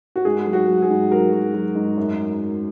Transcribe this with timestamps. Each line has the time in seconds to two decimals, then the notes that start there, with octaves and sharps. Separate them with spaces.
0.16 F#4
0.25 G#2 G#4
0.46 F#3
0.53 F#4
0.68 F#3
0.82 G#4
0.89 G#2
1.11 F#3 A#4
1.33 F#3
1.54 F#3
1.75 G#2
1.97 F#2